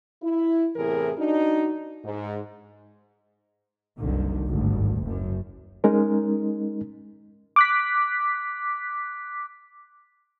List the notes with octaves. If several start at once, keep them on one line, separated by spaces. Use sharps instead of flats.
E4
E2 A2 C3 E3 G#4 A#4
D4 D#4 F#4
G#2
F#1 C2 D3 D#3
G#1 D2 G2
F#1 F#2
G#3 C#4 D#4 A#4
D6 F#6 B6